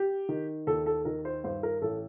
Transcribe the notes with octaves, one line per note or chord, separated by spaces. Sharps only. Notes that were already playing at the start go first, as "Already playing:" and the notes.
Already playing: G4
D#3
D#2 A4
A4
D#3 A#4
C5
G2 C5
A#4
A1 A4